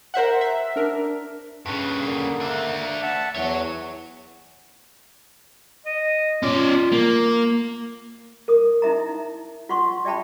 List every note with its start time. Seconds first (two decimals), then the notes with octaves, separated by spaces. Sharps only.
0.14 A#4 C5 E5 F#5
0.41 E5
0.76 D4 A#4
1.66 G2 C#3 B4
2.04 D3 A#3
2.41 D4 E5
3.02 E5 F#5 A5
3.35 E2 F#4 C#5
5.86 D#5
6.43 C#4 F4 D5
6.92 A#3
8.48 A#4 D#6
8.82 D#4 E4 E5 A#5
9.69 F4 F#5 C6 C#6
10.05 D5 E5 G5 A5 B5